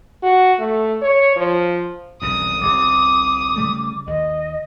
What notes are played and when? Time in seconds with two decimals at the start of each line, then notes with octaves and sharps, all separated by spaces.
0.23 F#4
0.59 A3
1.02 C#5
1.37 F3
2.22 E1 C2 F#2 D#6
2.61 G1 C2 D6
3.56 C#3 G3 A3
4.07 D#2 D#5